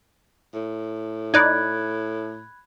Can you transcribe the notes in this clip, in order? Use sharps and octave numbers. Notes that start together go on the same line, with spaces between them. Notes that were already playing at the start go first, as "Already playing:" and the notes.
A2
D#4 D5 B5 F#6 G#6